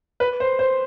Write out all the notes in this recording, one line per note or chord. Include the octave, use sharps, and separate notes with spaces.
B4
C5
C5